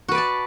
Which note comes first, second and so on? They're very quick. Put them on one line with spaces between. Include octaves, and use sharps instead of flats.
F#4 B4 D5 A5